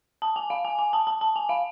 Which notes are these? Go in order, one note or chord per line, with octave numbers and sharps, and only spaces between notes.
A5
G#5
F5
G#5
G#5
A5
A5
A5
G#5
F5